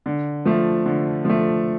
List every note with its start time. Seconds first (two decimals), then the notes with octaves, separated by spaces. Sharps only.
0.06 D3
0.46 F3 A3
0.86 D3
1.25 F3 A3